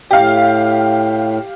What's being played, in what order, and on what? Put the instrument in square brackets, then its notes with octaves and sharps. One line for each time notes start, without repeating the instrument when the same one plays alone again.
[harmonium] A2 [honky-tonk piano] G4 F5